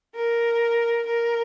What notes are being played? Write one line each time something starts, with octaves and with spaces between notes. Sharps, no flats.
A#4
A#4